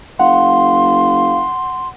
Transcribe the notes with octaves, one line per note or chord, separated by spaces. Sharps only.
F#1 F5 F#5 C6